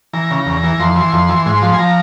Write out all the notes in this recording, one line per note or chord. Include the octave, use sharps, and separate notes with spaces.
E3 A#5
C#3
E2
E3
F2 C6
E3
F2
E3
G#2 C6
F3
G#5
F3 A#5